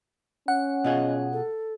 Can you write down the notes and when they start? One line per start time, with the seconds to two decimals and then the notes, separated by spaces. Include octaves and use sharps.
0.48 C#4 F#5
0.84 B2 F4 G#4 D#5
1.33 A4